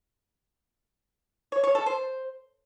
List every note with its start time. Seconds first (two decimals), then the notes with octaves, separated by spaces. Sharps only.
1.52 C#5
1.64 C#5
1.75 A4
1.86 C5